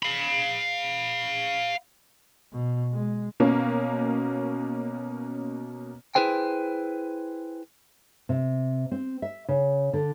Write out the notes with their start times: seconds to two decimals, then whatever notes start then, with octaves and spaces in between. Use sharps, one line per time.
0.03 F5 B5
2.52 B2
2.92 G#3
3.40 B2 A#3 C#4
6.15 E4 G#4 B4 C5 G5
8.29 C3
8.92 C4
9.22 E5
9.49 C#3
9.93 D3